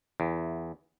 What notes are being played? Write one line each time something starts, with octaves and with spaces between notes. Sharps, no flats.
E2